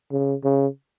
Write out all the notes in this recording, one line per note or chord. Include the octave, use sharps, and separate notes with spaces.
C#3
C#3